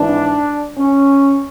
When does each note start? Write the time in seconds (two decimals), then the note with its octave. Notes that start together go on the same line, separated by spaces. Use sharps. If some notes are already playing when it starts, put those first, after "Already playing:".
Already playing: G#1 G#2 E3 D4
0.75 C#4